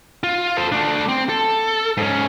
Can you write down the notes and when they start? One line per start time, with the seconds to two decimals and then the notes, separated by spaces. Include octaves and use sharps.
0.24 F4
0.57 A4 C5
0.72 A3 D4
1.09 C4
1.29 A4
1.97 G#2 C#4